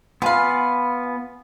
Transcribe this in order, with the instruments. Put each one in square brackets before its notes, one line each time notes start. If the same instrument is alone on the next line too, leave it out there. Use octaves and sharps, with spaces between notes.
[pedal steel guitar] B3 G#5 B5 [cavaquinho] F4 F5